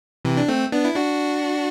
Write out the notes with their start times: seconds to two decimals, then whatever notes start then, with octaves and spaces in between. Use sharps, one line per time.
0.25 C3 E3
0.37 D4
0.48 A3 C4
0.72 B3 D4
0.85 E4
0.96 D4 F#4